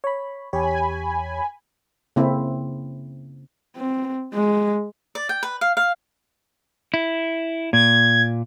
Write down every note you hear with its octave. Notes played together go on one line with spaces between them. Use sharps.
C#5 B5
E2 G4 C#5 G#5 B5
C#3 A#3 C4 E4
C4
G#3
D5
G5
B4
F5
F5
E4
A#2 G#6